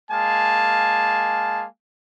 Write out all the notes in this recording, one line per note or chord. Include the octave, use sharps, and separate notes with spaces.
G#3 A#3 F5 G#5 A5